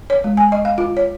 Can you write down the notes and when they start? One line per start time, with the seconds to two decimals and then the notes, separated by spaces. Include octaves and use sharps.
0.10 C#5
0.24 G#3
0.37 G#5
0.52 D#5
0.65 F5
0.78 F4
0.97 C#5